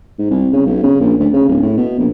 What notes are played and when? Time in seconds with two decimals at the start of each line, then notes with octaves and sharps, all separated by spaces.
0.19 G#2
0.30 C2
0.53 C#3
0.66 B1
0.83 C#3
1.00 A#1
1.20 D2
1.33 C#3
1.49 D1
1.63 A2
1.77 B2
1.99 A#1